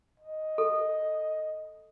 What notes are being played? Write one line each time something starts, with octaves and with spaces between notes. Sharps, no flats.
D#5
A4